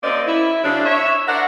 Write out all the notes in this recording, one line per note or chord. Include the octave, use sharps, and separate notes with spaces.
F#2 A#3 C4 C#4 D5 D#5
E4
C#3 F#3 C4 D4
C#5 E5
D4 A#4 C5 F#5